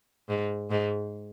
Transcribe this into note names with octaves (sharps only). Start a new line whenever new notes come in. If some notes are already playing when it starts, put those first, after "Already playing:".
G#2
G#2